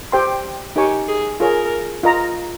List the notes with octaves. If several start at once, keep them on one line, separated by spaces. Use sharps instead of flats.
G4 C5 G5 C6
D#4 G4 A#4 C#5 G#5 C#6
G#4
F4 G#4 A#4 C#5
F4 A#4 D#5 A#5